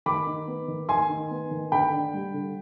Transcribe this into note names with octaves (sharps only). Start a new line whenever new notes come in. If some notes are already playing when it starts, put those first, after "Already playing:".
D#3 B5 D6
D#4
B3
D#3
D#3 G#5 C6
D#4
B3
D#3
D3 G5 B5
D4
G3
D3